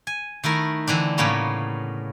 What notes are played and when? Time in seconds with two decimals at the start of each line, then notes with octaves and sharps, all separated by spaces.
0.07 G#5
0.44 D#3 A3 E4 A#4
0.87 D3 E3 C4 D4
1.18 A2 C#3 A#3 B3 C#4